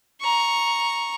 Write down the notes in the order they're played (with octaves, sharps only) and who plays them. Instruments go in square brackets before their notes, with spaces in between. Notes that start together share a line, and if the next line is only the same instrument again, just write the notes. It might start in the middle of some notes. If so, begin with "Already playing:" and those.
[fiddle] A#5 C#6